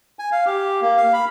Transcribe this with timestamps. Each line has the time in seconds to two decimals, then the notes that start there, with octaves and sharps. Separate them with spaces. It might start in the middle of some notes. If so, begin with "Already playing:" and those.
0.19 G#5
0.32 F5
0.46 G4
0.82 A#3
0.97 F5
1.13 B5